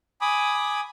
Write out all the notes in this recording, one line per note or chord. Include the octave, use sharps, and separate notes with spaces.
G#5 B5 D6 D#6